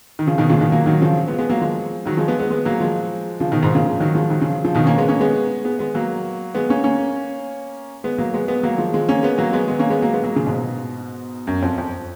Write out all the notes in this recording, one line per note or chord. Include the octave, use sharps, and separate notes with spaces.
D#3
C#3 F3
B2 D#3
A#2 C#3
B2 D#3
F#3 A#3
D#3 F#3
C#3 F3
G#3 B3
G#3 B3
F#3 A#3
F3 G#3
D#3 F#3
F3 G#3
G#3 B3
G#3 B3
G#3 B3
F#3 A#3
F3 G#3
C#3 F3
B2 D#3
G#2 B2
A#2 C#3
C#3 F3
D#3 F#3
F3 G#3
D#3 F#3
C#3 F3
C#3 F3
B2 D#3
A#3 C#4
G#3 B3
A#3 C#4
G#3 B3
G#3 B3
G#3 B3
F#3 A#3
G#3 B3
A#3 C#4
A#3 C#4
G#3 B3
F#3 A#3
G#3 B3
G#3 B3
F#3 A#3
F3 G#3
F3 G#3
A#3 C#4
G#3 B3
F#3 A#3
G#3 B3
G#3 B3
A#3 C#4
G#3 B3
F#3 A#3
G#3 B3
F#3 A#3
A#2 C#3
G#2 B2
F#2
F2
F2